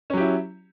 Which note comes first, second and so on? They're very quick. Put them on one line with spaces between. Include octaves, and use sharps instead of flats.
C#4 F#3 G4 E4